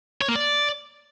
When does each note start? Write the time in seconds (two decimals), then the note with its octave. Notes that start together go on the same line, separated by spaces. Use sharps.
0.21 C#5
0.28 A#3
0.36 D5